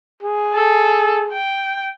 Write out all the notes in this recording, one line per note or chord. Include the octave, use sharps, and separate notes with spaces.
G#4
A4
G5